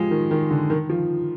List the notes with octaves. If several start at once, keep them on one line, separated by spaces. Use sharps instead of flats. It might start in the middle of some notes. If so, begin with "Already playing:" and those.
Already playing: F3 G#3 G4
D#3
D#3
D3
D#3
F3